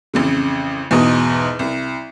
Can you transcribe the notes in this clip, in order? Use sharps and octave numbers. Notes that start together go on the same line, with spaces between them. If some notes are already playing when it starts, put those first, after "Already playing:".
A1 F2 C#3
E2 G#2 B2 D#5
C2